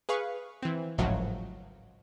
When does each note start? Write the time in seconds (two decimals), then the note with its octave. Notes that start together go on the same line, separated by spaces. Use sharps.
0.09 G#4 B4 F5 C#6
0.62 E3 C4
0.98 G#1 C#2 A2 C#3 F3 F#3